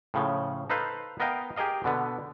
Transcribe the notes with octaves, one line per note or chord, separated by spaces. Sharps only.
A2 C#3 F3
D#4 A4 B4 C5 F5
B3 A#4 D#5 F5 G5
G4 G#4 A#4 D#5 F5
B2 D3 B3